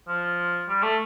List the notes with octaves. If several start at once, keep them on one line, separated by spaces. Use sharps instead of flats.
F3
G3
A3